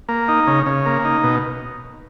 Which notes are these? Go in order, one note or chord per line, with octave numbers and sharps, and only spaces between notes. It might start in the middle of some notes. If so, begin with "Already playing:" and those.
A#3
D#4
C#3
C#3
A#3
D#4
B2